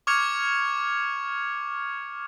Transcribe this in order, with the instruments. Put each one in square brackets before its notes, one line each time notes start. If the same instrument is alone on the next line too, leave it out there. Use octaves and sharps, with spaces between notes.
[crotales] C#6 D6 F6 G#6 C#7 F7